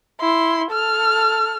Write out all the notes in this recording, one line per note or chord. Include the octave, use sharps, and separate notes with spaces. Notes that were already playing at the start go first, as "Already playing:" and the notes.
E4 C6
A4 F6